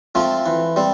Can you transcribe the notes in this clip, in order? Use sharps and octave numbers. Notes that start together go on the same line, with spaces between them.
F3 A3 C4 F4
E3
G3 C4